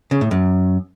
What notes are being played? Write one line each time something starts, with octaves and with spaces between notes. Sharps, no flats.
C#3
A2
F#2